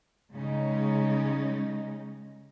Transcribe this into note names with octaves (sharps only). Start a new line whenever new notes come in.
C#3 G3 G#3 C#4 D#4